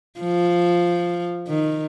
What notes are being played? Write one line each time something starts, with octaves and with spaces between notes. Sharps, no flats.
F3
D#3